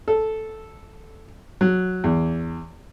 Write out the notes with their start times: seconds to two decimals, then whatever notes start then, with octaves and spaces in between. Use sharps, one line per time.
0.08 A4
1.61 F#3
2.04 E2